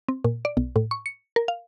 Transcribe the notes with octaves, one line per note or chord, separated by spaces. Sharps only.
C4
A#2
D5
B1
A2
C#6
C#7
A#4
F5